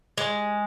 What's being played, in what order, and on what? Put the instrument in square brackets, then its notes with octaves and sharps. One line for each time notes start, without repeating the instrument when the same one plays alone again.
[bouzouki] G#3